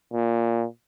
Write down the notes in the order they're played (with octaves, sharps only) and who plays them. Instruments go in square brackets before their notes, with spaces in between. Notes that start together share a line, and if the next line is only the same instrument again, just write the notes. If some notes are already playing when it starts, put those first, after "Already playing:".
[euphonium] A#2